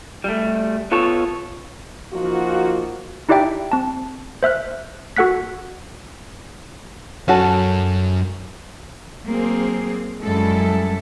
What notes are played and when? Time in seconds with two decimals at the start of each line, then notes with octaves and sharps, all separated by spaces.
0.24 G3 A3
0.92 B3 F4 A4 C#5
2.13 F3 A#3 D#4 F4 F#4
3.29 D#4 E4 G4 D5 E5 G5
3.72 C4 A5
4.43 C5 E5 F6 F#6
5.16 F#4 A4 F#5 F#6 B6
7.28 F#2 C#4 F#4 A4
9.25 F#3 A#3 C4 G#4
10.22 F#2 G3 G#3 E4 A4